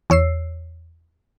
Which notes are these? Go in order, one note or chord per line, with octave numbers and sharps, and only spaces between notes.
E2 C#5 E6 C7